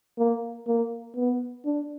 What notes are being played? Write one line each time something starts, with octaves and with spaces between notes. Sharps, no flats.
A#3
A#3
B3
D4